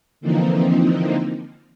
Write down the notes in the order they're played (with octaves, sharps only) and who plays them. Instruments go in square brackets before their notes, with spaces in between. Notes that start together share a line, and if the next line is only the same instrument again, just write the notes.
[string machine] D3 E3 F3 A#3 C4 D#4